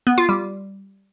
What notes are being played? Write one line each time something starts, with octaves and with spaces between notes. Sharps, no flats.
B3
F4
G3